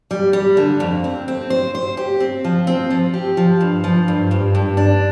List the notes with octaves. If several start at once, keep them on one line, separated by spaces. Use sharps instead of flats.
G3
G3
D3
F2
C4
C4
C5
C5
G4
C4
F3
C4
F3
G4
F3
G2
F3
G2
G2
G2
D4